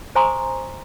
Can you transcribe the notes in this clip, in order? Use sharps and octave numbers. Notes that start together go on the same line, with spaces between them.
C5 G#5 A#5 C6 C#6 D#6